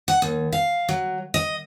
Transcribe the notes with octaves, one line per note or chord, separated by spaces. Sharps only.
F#5
D#2
F5
F#3
D#5